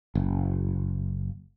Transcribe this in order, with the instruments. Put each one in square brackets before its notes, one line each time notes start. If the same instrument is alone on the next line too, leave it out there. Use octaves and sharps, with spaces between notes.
[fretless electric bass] F#1